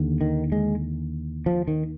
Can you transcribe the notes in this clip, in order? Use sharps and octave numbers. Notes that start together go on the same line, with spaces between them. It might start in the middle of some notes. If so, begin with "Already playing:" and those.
Already playing: D#2 D3
D#3
G#3
F3
D#3